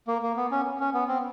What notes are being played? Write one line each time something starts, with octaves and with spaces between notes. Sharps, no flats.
A#3
A#3
B3
C#4
C#4
B3
C4